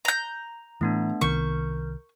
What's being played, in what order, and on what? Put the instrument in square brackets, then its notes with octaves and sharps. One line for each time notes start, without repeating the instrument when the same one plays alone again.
[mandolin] A#5 G6
[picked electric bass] A2 E3 [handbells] A3 B3 D4
[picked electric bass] C2 D#3 B3 [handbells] A#4 G6 [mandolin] C#6